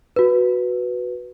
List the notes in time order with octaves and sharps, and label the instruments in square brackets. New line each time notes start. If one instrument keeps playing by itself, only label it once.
[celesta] F#4 B4